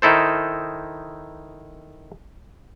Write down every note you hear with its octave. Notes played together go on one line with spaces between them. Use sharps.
D#3 D#4 E4 A4 C5